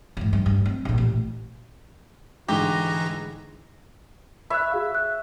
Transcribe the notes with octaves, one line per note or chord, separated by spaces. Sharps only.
G#2 E3
G2 E3
G2
C4
A#1 D3
A1
G#2 D3 E3 G#3 F#4 G4 A#5
C#5 E5 B5 F#6
F#4 G#4 F5
F#6